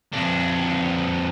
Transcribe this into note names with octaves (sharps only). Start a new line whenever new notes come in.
F2 D4